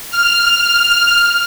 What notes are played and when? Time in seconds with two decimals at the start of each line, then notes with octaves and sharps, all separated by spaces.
0.11 F6